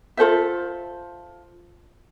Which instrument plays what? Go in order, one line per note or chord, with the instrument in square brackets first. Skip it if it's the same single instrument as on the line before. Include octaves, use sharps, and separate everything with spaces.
[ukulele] F4 A4 C5 E5